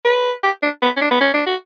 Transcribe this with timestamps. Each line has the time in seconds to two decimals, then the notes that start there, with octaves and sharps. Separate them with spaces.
0.05 B4
0.44 G4
0.63 D4
0.82 B3
0.97 C#4
1.01 D4
1.11 B3
1.21 C#4
1.34 D4
1.47 F#4